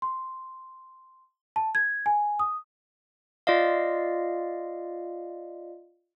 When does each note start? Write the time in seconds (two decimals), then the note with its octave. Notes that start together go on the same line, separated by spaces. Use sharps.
0.02 C6
1.56 A5
1.75 G#6
2.06 G#5
2.39 D#6
3.47 F4 D5 D#5 F5